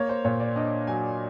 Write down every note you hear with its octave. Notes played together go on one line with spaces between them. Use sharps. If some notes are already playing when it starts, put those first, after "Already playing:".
Already playing: A#3 C#5
C5
A#2 C#5
D5
D4 D#5
F#3 G#5